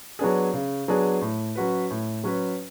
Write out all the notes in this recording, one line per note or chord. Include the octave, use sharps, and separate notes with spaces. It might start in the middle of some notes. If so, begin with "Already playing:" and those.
F#3 B3 D4 G#4
C#3
F#3 B3 D4 G#4
A2
F#3 C#4 F#4 B4
A2
F#3 C#4 F#4 B4